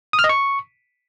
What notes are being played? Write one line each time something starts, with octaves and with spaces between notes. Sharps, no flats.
D#6
F6
D#5
C#6